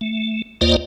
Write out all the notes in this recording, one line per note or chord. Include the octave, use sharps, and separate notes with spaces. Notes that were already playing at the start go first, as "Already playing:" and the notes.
A3
D#2 A#3 F4 C5 D5 D#5